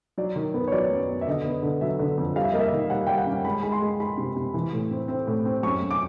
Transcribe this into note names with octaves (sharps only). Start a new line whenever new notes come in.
F#3 D5
D#3
B3
C#5
F#3 D5
F#2
B3
E5
D3 D#5
B3
D3
F#3 E5
D3
F2
G3 F5
E5
A#3 D#5
E5
D#3
G3 F#5
G3 G5
F#5
C#4
G#3 B5
G#3 B5
C6
G#3
G#3 B5
C3
C3
E3
A2
C4
C4
A2
C4
F#2 C#6
F#2
D6